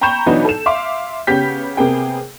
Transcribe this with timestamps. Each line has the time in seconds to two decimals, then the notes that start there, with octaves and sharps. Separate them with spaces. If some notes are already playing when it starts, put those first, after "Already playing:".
0.01 G5 A#5 B5 C#6 G6 E7
0.26 B2 E3 F#3 B3 D4 D#4
0.45 A4 E7
0.66 E5 F5 C6 D6
1.27 C#3 B3 C#4 G4 G6 B6
1.77 C3 A#3 B3 G#4 G5